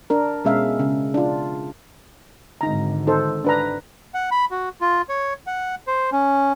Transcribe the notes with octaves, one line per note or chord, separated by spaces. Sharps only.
D4 A#4
B2 G#3 C#4 E5 F5
C#3
D4 F4
G#1 D3 D#4 A#5
D#4 A4 C5
D4 B4 A#5
F#5
B5
F#4
F4
C#5
F#5
C5
C#4